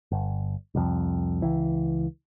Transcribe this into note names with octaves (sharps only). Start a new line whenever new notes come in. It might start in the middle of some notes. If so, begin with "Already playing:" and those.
G1
C2 F2
C#2 E3